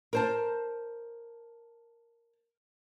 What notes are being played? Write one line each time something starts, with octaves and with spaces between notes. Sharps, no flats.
A#4 C5 A5